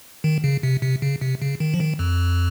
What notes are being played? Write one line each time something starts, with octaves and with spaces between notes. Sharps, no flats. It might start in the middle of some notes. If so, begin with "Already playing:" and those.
D#3
C#3
C3
C3
C#3
C3
C#3
D#3
F3
D#3
F2